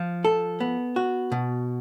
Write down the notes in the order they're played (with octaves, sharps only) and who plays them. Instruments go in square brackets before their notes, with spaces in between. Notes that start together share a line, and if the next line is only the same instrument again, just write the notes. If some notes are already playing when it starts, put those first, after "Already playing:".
Already playing: [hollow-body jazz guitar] F3
A4
B3
F#4
B2